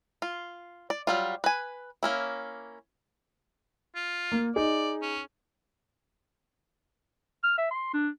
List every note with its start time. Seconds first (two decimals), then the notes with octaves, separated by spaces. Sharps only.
0.22 F4
0.90 D5
1.07 F#3 G3 F4
1.44 B4 G#5
2.03 A#3 C#4 E4
3.96 F4
4.32 A#3
4.56 D#4 G#4 D5
5.02 C#4
7.43 F6
7.58 E5
7.71 C6
7.93 D4